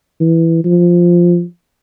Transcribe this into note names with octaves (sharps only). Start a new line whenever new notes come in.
E3
F3